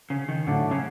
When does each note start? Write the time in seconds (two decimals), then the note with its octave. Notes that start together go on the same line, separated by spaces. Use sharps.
0.10 C#3
0.29 D#3
0.47 A2 D3 F#3 A3 D4
0.71 C#3